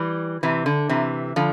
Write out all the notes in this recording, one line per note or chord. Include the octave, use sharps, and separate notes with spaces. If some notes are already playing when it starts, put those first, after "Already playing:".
Already playing: E3 G3
C3 E3
D3
C3 E3
D3 F3